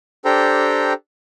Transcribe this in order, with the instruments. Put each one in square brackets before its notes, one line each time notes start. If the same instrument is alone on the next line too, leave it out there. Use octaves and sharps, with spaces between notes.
[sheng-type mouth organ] D4 G4 A4 C5 G5 A#5